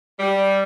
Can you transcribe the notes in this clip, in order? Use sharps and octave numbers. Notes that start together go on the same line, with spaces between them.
G3